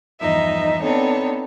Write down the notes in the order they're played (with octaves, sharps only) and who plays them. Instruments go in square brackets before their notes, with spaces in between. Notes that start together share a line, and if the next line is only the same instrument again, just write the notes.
[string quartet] E2 G2 F3 D#4 D#5 E5
B3 C4 D4 D#4 A4 C#5